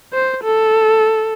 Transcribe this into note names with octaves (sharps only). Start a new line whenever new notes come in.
C5
A4